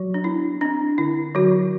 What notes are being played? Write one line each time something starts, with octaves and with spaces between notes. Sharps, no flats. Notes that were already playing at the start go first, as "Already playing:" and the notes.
Already playing: F#3 F#4
D4
B3 E4
C4 D4
D3 E4
D3 F#3 F#4